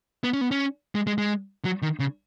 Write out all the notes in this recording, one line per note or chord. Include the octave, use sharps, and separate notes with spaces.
B3
C#4
B3
C#4
G#3
G#3
G#3
F#3
D#3
C#3